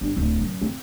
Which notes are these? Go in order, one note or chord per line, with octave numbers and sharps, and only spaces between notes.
G1
D1
F#2
C4